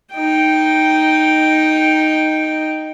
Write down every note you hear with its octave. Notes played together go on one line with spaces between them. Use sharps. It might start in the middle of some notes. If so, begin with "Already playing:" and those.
D#4 G5